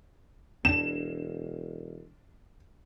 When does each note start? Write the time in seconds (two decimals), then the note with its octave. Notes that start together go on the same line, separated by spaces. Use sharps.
0.65 E1 C4 D4 E7